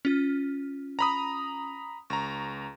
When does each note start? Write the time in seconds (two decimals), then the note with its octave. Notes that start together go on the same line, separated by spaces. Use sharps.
0.05 C#4 F4 F6
0.99 A#5 B5 D#6
2.10 C#2 A#5 C#6